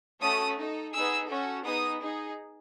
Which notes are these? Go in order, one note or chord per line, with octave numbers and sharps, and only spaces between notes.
A3 C#4 F#4 A4 D#6
D#4 A4
B3 D#4 G#4 E6
C#4 F#4 A4
B3 D#4 G#4 D#6
D#4 G#4